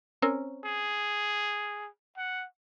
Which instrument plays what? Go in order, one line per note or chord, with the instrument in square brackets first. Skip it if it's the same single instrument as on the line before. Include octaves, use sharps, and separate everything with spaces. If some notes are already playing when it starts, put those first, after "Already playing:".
[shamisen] C4 C#4 A#4
[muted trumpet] G#4
F#5